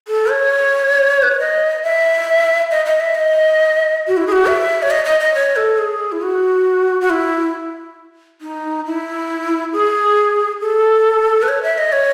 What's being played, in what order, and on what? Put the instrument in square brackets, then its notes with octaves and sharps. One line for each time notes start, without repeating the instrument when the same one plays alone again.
[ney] A4
C#5
B4
C#5
D#5
E5
D#5
D#5
E5
D#5
F#4
E4
G#4
F#4
E5
C#5
D#5
D#5
D#5
C#5
A4
G#4
E4
F#4
F#4
E4
D#4
E4
G#4
A4
B4
C#5
E5
D#5
C#5